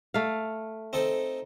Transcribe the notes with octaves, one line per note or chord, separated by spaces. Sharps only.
A3 F5
C4 D#4 A4